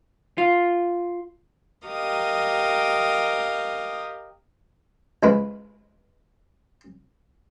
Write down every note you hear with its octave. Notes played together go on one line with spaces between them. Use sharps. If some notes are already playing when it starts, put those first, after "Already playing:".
F4
G4 A#4 D#5 F5 D#6
C#2 G#3 E4 B4